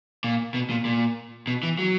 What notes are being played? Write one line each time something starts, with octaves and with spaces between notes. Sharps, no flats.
A#2
B2
A#2
A#2
B2
E3
F#3